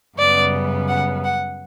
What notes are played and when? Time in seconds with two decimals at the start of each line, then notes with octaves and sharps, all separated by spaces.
0.17 F#2 C#3 G3 B3 D5
0.88 F#5
1.24 F#5